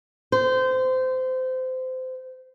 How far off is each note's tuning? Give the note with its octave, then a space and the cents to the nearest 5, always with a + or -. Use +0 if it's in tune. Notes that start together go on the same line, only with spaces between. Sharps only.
C5 -25